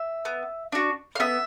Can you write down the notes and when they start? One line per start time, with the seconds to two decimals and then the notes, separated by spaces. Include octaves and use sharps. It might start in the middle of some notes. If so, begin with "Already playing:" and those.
Already playing: E5
0.25 B3
0.72 D4 F#4
1.15 F5
1.20 B3 E5